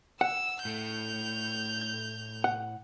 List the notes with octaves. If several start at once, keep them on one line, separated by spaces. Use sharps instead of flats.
F#5 E6
A2 A3 G6 F7
F#5